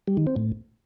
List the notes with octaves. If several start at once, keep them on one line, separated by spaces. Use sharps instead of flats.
G3
D#3
C4
A2